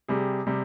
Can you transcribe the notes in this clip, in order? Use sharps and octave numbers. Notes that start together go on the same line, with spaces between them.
C3 G3 G#4
C3 G3